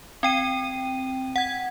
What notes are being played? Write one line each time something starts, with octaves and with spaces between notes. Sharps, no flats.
C4 G5 D#7
F#5 G#6